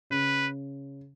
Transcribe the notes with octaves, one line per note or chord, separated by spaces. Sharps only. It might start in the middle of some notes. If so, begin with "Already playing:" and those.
C#3 B4